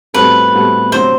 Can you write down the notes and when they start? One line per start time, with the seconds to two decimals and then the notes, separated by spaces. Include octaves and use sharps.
0.14 A2 G3 C4 F#4 A4 B4
0.53 A2 G3 C4 F#4 A4
0.92 D2 C3 F#3 C4 C5